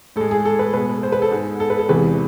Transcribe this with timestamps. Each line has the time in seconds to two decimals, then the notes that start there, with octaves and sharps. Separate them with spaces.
0.16 A2 G#3 A4
0.31 G#4
0.45 A4
0.59 B4
0.73 B2 G#3 B4
1.03 C5
1.12 B4
1.22 A4
1.31 G#2 G#3
1.60 A4
1.70 B4
1.79 A4
1.89 E2 C3 E3 G#3 B4